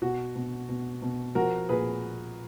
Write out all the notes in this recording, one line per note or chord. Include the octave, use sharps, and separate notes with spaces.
B2 F#4
B2
B2
B2
F3 F#4 A#4
A#2 G#4 B4